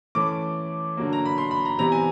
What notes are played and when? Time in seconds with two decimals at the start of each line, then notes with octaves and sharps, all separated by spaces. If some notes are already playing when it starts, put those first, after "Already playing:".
0.15 E3 A3 C#4 D6
0.97 D3 F#3 A#3
1.13 A#5
1.25 B5
1.38 C6
1.51 B5
1.65 A#5
1.79 C3 E3 G3 B3 A#5
1.92 G#5